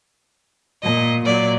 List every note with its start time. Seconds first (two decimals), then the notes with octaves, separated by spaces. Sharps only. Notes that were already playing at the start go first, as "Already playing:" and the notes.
0.82 A#2 D#5
1.25 A#2 F#3 D5